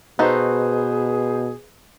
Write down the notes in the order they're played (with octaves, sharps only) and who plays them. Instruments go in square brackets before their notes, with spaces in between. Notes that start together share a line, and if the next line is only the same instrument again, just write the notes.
[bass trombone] B2 [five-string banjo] D#4 F#4 A4 [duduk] G#4 [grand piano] B4 C5